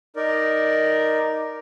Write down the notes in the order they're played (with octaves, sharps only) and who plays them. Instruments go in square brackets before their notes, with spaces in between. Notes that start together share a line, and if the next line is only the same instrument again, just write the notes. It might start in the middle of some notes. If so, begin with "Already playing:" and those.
[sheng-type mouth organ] D#4 A#4 D5